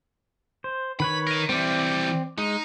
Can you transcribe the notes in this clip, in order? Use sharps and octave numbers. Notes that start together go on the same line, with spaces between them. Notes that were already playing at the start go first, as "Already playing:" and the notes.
C5
D#3 B4 C#5 B5
A#4 D#5
E3 G3 C4 D5
G#3 D#4